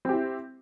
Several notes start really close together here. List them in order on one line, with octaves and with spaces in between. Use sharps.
C4 G4 E4